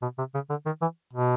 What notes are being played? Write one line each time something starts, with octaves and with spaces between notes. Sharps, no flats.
B2
C3
C#3
D3
D#3
E3
B2